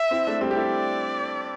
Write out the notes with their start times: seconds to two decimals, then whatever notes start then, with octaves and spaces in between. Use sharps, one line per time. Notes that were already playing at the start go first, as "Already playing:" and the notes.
Already playing: E5
0.11 C4 E4
0.27 A3 D4
0.41 G3 C4
0.51 G4
0.56 E4 A4 D5